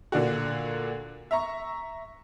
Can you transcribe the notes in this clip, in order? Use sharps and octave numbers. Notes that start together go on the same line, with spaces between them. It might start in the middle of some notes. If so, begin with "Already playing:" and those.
A#2 D3 D4 F#4
E5 A#5 C#6